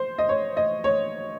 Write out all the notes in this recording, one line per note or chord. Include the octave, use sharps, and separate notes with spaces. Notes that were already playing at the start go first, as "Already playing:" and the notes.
Already playing: C5
D#5
C#5
D#5
C#5